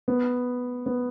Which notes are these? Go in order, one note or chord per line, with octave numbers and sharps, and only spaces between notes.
B3
B3